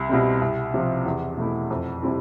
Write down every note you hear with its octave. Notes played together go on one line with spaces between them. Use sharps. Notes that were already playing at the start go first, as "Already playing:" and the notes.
Already playing: C2
B2 G3 C4
C2
C3 F3
E2
B2 A3 E4
F2
C3 G3 C4 E4